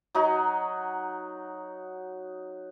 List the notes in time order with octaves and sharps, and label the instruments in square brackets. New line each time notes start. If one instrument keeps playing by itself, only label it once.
[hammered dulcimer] F#3 D#4 F#4